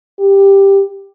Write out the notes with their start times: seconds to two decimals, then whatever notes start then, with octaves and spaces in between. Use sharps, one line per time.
0.20 G4